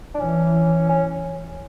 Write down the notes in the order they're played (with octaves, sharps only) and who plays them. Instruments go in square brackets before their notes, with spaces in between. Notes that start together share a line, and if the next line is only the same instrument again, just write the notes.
[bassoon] D4
[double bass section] E3 [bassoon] C#4
[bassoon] C#4